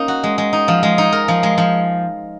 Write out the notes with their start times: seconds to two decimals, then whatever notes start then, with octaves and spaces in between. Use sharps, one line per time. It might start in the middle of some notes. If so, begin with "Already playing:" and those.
Already playing: A#3 C#4 D#4
0.08 F#4
0.23 G#3
0.38 G#3
0.53 D#4
0.68 F3
0.83 G#3
0.98 D#4
1.12 A#4
1.28 F3
1.43 G#3
1.58 F3